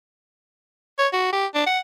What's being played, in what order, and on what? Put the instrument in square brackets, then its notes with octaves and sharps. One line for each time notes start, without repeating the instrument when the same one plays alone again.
[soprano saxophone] C#5
F#4
G4
D4
F#5